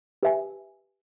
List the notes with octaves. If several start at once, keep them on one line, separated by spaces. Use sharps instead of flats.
G4 B4 E5 G#5